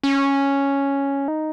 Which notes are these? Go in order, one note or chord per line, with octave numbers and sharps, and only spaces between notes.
C#4
D#4